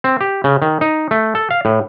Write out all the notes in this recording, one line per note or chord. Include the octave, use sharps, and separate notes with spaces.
C4
G4
C#3
D#3
D#4
A3
A4
F5
A2